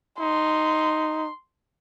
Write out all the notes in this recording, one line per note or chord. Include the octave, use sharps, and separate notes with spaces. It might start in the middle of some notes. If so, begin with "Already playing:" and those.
D#4 C6